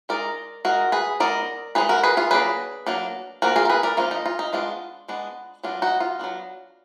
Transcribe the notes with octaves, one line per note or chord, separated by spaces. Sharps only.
G#3 D#4 A#4 D5
G#3 D#4 F#4 A#4
G#4 B4
G#3 B3 D#4 A#4 D5
G#3 B3 D#4 G#4 B4
F#4 A#4
G#4 B4
F4 G#4
F#3 A#3 D4 G#4 B4
F#3 A#3 D4
F3 A#3 D4 F#4 A#4
F4 G#4
A#4
G#4 B4
A#4 D5
F3 A#3 D4 F4
D#4
F4
D#4
G#3 B3 D4 F4
G#3 B3 D4
F#3 B3 D4 F4
D#4 F#4
F4
F#3 B3 D4